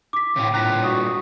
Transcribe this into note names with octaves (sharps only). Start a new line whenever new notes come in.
D6 B6
A2 C#3 C4 C#4
G2 A#2 A#5 F#6 A#6 B6
F#4 D#6